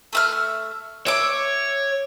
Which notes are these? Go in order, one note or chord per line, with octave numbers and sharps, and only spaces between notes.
A3 E5 F6
C#5 E5 D6